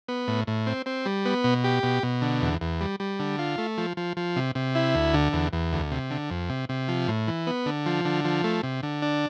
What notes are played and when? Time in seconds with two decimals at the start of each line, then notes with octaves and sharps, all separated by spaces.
0.08 B3
0.28 A2
0.47 A2
0.67 C4
0.86 C4
1.06 G3
1.25 B3
1.44 B2
1.64 G4
1.83 B2
2.03 B2
2.22 D3
2.42 E2
2.61 E2
2.81 G3
3.00 G3
3.19 D3
3.39 F4
3.58 A3
3.78 F3
3.97 F3
4.17 F3
4.36 C3
4.55 C3
4.75 E4
4.95 D2
5.14 D3
5.33 E2
5.53 E2
5.73 D2
5.91 C3
6.11 D3
6.30 F2
6.50 C3
6.69 C3
6.88 F3
7.08 A2
7.28 E3
7.47 B3
7.66 D3
7.86 F3
8.05 D3
8.24 F3
8.44 A3
8.63 C3
8.83 D3
9.02 D4